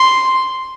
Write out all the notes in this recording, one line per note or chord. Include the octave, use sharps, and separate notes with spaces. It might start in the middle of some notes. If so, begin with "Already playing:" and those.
Already playing: C6